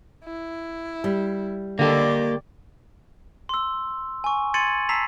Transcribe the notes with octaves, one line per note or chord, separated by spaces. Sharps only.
E4
G3
D3 A#3 G4 A4 D5
C6 E6
G#5 C#6
C6 G#6 A6 C#7 D#7 F#7
A5 A#5 E6 B6 C7 F7